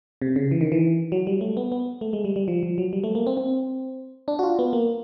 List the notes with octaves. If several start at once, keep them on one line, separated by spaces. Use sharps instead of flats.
C3
C#3
E3
D#3
E3
F#3
G3
A3
B3
B3
A3
G#3
G3
G3
F3
F3
F#3
G3
A3
A#3
C4
C4
D4
F#4
F4
B3
A#3